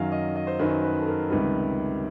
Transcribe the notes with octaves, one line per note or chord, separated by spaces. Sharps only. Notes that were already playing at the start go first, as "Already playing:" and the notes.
Already playing: F#2 D#3 F#3 F5
D#5
D#5
C5
F#2 D#3 F#3 B4
B4
A4
A#4
C#2 C3 D#3 G3 B4